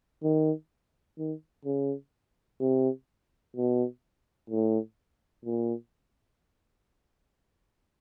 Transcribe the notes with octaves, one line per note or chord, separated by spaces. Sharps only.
D#3
D#3
C#3
C3
B2
A2
A#2